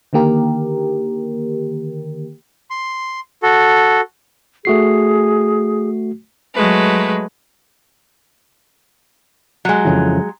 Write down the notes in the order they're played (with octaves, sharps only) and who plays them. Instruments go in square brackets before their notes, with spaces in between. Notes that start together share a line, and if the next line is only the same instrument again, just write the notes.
[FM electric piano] D3 D#3 A#3 G4 A#4
[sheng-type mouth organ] C6
F#4 A4
[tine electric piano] A3 F#4 C7 [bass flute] G#4
[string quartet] F#3 G#3 A3 B4
[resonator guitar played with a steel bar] F#3 G#3
[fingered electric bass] F2 C#3 E3